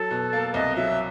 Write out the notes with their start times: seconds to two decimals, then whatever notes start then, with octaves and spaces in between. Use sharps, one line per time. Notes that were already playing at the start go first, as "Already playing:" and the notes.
Already playing: F#3 A4
0.11 B2
0.33 A#3
0.54 C2 D#5
0.76 F#3 E5